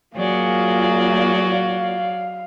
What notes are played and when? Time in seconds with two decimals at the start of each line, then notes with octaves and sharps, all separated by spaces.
0.17 F#3 A#3 F4 G#4 D5
1.52 F5